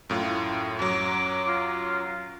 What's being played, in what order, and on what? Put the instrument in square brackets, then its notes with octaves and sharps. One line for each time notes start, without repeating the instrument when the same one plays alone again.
[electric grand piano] F#2 A2 F4
[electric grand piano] F#2 F#3 [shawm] D6
[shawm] F4